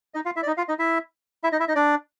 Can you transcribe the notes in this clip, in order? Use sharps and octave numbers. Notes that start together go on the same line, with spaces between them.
D#4 D#5
F4 F5
E4 E5
D5
D#4 D#5
F4 F5
D#4 D#5
E4 E5
E4 E5
D#4 D#5
E4 E5
D#4 D#5
D4 D5